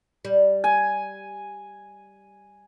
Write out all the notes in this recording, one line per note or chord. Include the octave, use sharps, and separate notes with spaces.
G3
G#5